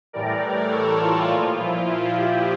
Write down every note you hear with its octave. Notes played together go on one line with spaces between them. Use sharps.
A2 E3 G3 A#4 D5
A4 C#5
F4 A4
A#2 F3 F4
E4
E4 G4